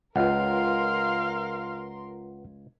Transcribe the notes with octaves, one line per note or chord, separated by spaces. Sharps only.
C#2 F4 A#4 B4 F5 F#5 C6